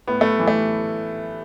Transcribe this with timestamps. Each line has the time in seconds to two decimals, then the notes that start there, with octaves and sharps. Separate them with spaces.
0.08 A2 B3
0.21 A3
0.39 E3
0.48 A3